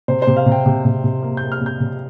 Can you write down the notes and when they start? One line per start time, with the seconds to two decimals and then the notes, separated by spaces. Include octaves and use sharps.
0.08 C3 C5
0.22 C5
0.27 C3
0.37 F5
0.46 C3
0.52 G5
0.66 C3
0.85 C3
1.04 C3
1.23 A#3
1.37 A#3 G6
1.52 F6
1.61 C3 G6
1.80 C3